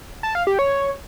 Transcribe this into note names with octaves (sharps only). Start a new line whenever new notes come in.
A5
F5
G4
C#5